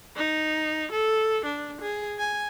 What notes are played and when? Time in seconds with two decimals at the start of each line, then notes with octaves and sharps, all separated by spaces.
0.17 D#4
0.92 A4
1.45 D4
1.81 G#4
2.19 G#5